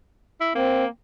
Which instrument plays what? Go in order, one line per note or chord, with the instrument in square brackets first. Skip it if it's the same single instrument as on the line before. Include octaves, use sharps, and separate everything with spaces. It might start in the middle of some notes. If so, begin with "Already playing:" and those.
[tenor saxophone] E4
[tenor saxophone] A#3 [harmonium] C4